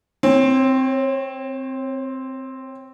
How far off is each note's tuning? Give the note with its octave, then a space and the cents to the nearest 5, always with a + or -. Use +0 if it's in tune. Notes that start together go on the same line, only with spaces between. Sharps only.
C4 +0 C#5 -35